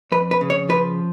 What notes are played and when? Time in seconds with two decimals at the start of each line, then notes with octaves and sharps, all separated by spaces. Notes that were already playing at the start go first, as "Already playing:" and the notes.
0.12 F2 B4
0.31 B4
0.41 C#3
0.50 C#5
0.69 F3 B4